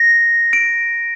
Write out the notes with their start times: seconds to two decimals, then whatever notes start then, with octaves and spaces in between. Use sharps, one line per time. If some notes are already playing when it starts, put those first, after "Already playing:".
Already playing: A#6
0.53 D7